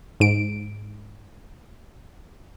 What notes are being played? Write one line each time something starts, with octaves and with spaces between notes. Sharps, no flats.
G#2 D7